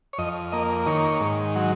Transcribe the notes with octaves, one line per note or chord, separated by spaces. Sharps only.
C#5
F2 D#5
A#3 D#5
D#3 C#5
G#2
F#3